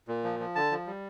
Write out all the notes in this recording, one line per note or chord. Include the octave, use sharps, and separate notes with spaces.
A#2
F3
F3
D3 A5
F3
G3